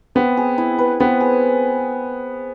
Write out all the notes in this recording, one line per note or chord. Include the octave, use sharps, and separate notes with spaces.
B3 C4
G#4
E4
B4
B3 C4
G#4